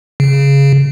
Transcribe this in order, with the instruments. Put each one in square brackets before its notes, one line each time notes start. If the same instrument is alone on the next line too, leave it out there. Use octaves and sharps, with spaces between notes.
[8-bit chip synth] C#3